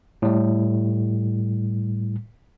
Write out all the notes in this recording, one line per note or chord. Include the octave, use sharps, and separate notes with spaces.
A2 G3